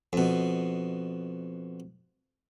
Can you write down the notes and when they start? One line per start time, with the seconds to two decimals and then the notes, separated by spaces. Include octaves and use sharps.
0.13 F2 B2